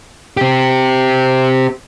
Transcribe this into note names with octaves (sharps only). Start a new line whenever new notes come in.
C4 G4